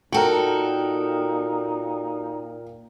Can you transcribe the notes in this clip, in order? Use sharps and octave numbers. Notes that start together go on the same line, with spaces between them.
A#2 D#4 F#4 A4 A#4 G5